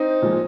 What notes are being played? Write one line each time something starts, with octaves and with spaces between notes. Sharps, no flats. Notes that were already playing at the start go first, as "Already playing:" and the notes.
Already playing: C4 D#4
A#2 F3 G#3